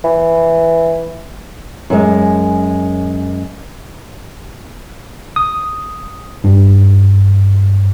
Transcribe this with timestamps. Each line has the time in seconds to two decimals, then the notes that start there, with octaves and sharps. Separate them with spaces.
0.04 E3
1.90 F#2 G#3
5.36 D#6
6.44 G2